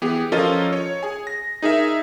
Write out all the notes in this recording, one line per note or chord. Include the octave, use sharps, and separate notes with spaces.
E3 B3 G4 G#4
F3 C#4 F4 A4 A#4 D#5
C#5
G#4 G#5
A#6
D#4 G#4 A#4 E5